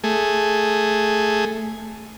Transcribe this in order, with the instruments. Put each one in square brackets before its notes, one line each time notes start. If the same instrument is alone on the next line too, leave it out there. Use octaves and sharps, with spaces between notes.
[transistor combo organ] A3 G#4